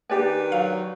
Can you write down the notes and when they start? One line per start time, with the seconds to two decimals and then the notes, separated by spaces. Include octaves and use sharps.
0.10 D#3 D4 G4 B4 D5 G#5
0.52 F#3 F5